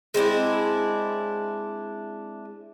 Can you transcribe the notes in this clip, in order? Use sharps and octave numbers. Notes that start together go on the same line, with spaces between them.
G#3 C4 D4 E4